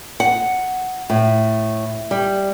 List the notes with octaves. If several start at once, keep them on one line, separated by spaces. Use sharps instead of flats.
F#5
A2
G3